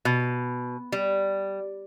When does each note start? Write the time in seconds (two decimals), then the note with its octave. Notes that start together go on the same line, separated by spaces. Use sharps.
0.05 B2
0.92 G3